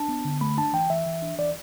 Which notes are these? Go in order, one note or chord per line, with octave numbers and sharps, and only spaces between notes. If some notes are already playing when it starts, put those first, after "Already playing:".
Already playing: D4 A5
B3
D3
A3 B5
D4 A5
E3 G5
E3 E5
E3
D4
E3 D5